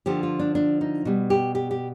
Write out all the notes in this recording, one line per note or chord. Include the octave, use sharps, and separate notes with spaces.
D3 F3 G4
F4
D4
D4
D#4
B2 G3
G4
G4
G4